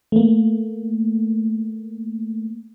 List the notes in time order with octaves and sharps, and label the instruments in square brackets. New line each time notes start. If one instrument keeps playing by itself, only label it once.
[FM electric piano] A3 A#3